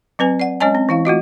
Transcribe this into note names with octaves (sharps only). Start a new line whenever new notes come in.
F#3 C4 B4 G#5
D5 F#5
G#3 C#4 C#5 D#5 G#5 A5
C4
E3 E4 F5
A3 F4 F#4 D#5